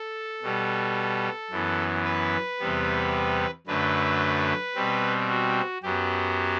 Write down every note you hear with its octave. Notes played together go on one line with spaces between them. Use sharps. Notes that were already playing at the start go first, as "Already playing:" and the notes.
Already playing: A4
B2 G3 B3
F#2 E3 B3
B4
E2 C3 G3 B3
F#2 D3 A3 B4
B2 G3 C4
F#4
F#2 F#3 B3 G4